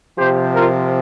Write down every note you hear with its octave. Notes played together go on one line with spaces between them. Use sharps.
C3 F3 G4 C5
F4 A#4